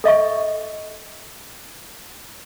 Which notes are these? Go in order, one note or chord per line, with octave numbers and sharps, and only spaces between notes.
A4 D#5 E5 C#6